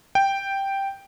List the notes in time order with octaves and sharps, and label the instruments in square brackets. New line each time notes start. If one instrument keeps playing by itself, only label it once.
[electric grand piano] G5